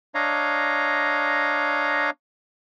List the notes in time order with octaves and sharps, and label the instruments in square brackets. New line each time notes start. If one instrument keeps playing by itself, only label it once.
[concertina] D4 C#5 D#5 F5 A#5